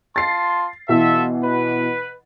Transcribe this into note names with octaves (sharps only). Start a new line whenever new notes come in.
F4 A5 C6 A6 C7
B2 E3 F4 A4 E5
B4